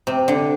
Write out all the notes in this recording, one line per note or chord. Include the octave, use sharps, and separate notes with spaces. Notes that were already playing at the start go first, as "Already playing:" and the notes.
C3
D3